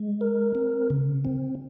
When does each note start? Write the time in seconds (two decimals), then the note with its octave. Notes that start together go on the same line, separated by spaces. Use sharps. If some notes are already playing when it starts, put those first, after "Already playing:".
Already playing: G#3
0.21 A#4
0.55 C4
0.90 C#3
1.25 C4